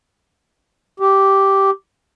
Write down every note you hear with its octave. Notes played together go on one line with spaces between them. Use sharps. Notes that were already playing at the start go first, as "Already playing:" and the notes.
G4